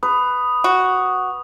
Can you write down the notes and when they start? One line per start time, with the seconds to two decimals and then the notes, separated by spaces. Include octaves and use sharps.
0.03 B4 D#6
0.64 F#4